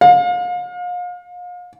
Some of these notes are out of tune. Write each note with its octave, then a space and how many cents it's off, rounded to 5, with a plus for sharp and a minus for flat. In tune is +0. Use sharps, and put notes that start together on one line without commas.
F5 +35